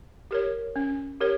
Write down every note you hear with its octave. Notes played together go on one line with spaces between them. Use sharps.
G4 A#4 C#5
C#4
G4 A#4 C#5